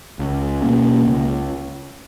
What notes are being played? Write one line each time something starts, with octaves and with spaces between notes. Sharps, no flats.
C#2
B2 A#3 C#4
C#2